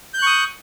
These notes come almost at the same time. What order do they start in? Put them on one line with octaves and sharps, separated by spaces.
G6 F#6 C#6 D#6